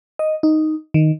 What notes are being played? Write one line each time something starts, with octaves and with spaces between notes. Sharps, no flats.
D#5
D#4
D#3